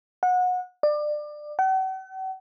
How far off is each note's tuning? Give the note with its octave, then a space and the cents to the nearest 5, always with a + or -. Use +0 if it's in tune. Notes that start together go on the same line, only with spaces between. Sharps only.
F#5 -25
D5 +25
F#5 +45